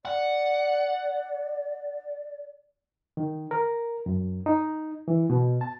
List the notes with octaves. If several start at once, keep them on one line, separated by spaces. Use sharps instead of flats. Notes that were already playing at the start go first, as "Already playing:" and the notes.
D5 F#5
D#3
A#4
F#2
D#4
E3
B2
A5